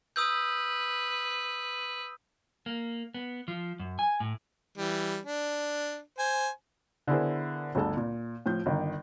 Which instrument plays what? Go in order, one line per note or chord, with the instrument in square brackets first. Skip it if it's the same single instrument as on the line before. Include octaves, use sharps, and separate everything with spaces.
[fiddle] B4 [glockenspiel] D#6 E6 G6
[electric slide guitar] A#3
B3
F3
F#2
G#5
A2
[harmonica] E3 G3
D4
C5 G#5
[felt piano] D3 B3 E4 G#4 A#4 C5
G1 D2 A4 A5
A#2
A2 F3 G6
G1 D#3